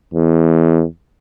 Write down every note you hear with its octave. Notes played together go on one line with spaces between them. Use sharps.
E2